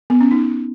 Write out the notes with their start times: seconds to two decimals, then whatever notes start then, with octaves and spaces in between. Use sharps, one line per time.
0.10 B3
0.20 C#4
0.31 D#4